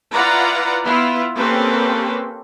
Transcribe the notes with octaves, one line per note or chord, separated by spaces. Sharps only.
E4 F4 B4 D5 F#5 A#5
B3 E4 F4
A#3 C4 C#4 G4 A4 B4